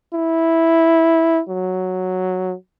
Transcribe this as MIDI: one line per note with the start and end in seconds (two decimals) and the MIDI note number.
0.13 1.41 64
1.48 2.55 54